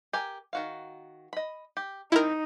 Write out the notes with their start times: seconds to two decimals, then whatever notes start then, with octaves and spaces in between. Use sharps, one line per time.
0.13 G4 A#4 G#5
0.53 D#3 F#4 F5
1.33 D#5 B5
1.77 G4
2.12 D#3 C4 D#4 E4 A#4